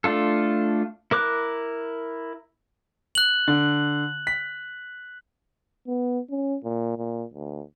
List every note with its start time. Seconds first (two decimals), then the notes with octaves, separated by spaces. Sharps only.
0.04 A3 D4 F4 A4
1.11 E4 A#4 D6 F#6
3.15 F#6 F#7
3.48 D3
4.27 B6
5.88 B3
6.30 C#4
6.64 A#2
6.98 A#2
7.34 D2